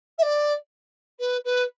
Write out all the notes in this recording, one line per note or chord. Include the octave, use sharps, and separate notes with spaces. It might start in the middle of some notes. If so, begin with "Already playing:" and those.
E5
D5
B4
B4